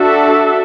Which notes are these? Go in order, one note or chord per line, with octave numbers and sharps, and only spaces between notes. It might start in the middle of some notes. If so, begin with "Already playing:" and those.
Already playing: D4 F#4 A4 E5